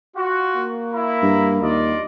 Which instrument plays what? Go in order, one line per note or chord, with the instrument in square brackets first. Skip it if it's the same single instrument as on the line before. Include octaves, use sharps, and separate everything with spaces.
[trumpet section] F4 F#4
[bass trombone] A#3
[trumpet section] E4 A#5 B5
[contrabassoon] G2
[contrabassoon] D#2 [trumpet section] F4 D5 D#5